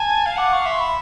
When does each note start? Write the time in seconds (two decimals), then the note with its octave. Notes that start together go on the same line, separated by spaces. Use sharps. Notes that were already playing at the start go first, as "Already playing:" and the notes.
Already playing: G#5 A5
0.26 F5
0.37 F#5 D6
0.53 F5 C#6
0.66 E5 C6
0.80 B5